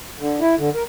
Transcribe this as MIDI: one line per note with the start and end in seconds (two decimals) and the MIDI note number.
0.19 0.40 50
0.41 0.55 64
0.58 0.70 50
0.75 0.83 70